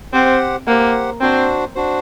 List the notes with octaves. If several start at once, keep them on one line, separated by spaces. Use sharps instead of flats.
C4 G4 C5 F#5
A#3 G4 C5 F#5
C4 D4 F#4 C5
D4 F#4 C5